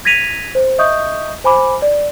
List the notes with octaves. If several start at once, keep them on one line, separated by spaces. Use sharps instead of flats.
G#6 A#6 B6 D#7 F7
C5
D#5 E5 C#6 D#6 G6
C5 G#5 B5 D6
D5